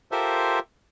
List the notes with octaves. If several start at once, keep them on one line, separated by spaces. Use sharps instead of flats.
F4 G4 A4 A#4 C5 E5